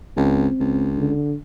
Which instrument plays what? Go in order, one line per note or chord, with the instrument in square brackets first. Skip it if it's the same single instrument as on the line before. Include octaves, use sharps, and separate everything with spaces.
[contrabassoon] C#2 [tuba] C4
[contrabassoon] C#2
[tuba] D3